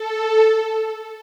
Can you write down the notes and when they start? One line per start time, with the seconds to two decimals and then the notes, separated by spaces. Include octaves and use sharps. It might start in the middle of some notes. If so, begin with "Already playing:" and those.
Already playing: A4